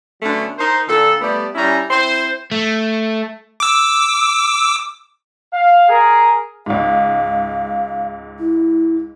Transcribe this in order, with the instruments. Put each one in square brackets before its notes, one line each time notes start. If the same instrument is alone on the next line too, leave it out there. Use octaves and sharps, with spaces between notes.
[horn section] D3 F#3 A3 B3 C#4
D#4 A#4 C5
A#2 D3 A4
G3 A3 B3 G4 D5
G3 C#4 E4 G#5 A#5
C4 E4 C5
[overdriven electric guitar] A3
[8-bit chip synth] D6 E6
[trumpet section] F5
G#4 A#4
[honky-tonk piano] C#2 G#2 [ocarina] F5
[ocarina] E4